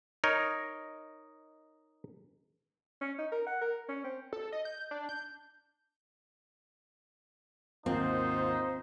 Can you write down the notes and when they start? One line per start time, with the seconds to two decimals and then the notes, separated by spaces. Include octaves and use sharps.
0.24 D#4 A#4 C#5 D#5
3.01 C#4
3.18 D#4
3.32 A#4
3.47 F#5
3.61 A#4
3.89 C#4
4.04 C4
4.33 A4
4.52 D#5
4.65 G6
4.91 D4
5.09 G6
7.86 G#1 D#2 C4 D#4 F4 C5